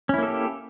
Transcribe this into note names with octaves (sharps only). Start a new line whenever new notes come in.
A#3 C#4 E4 G4 A4